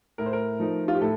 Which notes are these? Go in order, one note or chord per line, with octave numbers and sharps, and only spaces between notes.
A2 A#4
C5
A#4
F3 A3 D#4
F4
G4
A2 A4